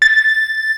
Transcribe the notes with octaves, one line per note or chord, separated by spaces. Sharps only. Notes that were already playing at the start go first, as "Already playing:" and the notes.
A6